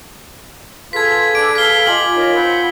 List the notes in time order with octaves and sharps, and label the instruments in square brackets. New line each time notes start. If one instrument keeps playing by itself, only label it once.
[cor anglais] F4 [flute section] G#4 A4 B4 [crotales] G#6 B6
[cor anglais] D4 [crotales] D7
[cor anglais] F5 [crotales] B6 G7
[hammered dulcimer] F4 G#5 D6 [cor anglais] G4 [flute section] D#5 A#5 [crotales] F#7
[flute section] D#4 A#4 C#5
[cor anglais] C4 [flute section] F#5 B5 G6